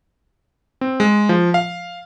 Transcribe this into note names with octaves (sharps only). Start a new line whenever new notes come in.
C4
G#3
F3
F5